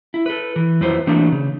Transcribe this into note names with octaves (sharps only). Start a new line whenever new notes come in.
E4
A4 B4
E3
F2 F#3 E4 B4 C5
E3 F#3 A3 A#3 C4 D4
C#3